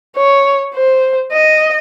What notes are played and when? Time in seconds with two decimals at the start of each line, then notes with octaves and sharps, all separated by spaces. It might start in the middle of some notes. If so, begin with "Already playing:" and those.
0.16 C#5
0.75 C5
1.33 D#5